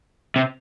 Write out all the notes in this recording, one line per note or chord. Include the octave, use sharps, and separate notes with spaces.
C3